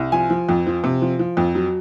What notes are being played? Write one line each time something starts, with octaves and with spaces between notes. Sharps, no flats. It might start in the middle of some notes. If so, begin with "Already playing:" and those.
Already playing: C2
F3 G#5
F3
F2
F3
C3
F3
F3
F2
F#3